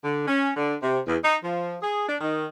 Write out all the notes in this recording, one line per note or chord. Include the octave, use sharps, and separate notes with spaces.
D3
C#4
D3
C3
E2
D#4
F3
G#4
D4
D#3